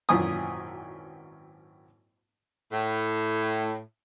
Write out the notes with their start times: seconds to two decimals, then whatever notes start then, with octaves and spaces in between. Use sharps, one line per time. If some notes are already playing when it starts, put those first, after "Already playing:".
0.09 G#1 F#2 A#2 E3 G#5 D#6
2.71 A2